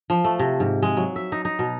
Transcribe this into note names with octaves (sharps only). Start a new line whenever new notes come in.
F3
A3
C3
G#2
G#3
F#3
E5
D#4
D#4
B2